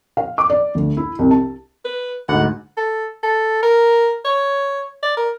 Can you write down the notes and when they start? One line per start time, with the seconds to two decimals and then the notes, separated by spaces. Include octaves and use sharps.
0.17 F5
0.38 D6
0.50 D5
0.75 D2
0.97 E4
1.19 C2
1.31 A5
1.85 B4
2.29 D2 G#2 F#5
2.77 A4
3.23 A4
3.63 A#4
4.25 C#5
5.03 D5
5.17 A#4